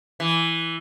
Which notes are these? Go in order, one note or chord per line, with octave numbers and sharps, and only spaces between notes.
E3